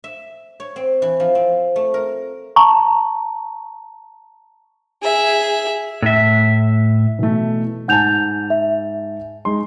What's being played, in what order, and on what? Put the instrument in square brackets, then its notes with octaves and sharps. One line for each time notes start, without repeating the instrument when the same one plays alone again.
[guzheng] E5
C#5
C4
E3
F3
C4
A3
A#4
[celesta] A5 A#5 C#6
[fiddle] G#4 E5
[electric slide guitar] A2 E5
[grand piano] B2 E3 A3
[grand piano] G#2 G#5 A5 [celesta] F#5 G6 F7
[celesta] E5
[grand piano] G#3 D#4 C6